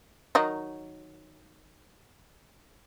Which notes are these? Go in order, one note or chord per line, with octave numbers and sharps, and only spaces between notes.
D#3 F#3 D#4